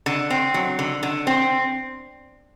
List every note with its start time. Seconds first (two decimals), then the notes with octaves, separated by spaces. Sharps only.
0.06 D3
0.30 C4
0.54 F#3
0.79 D3
1.03 D3
1.27 C4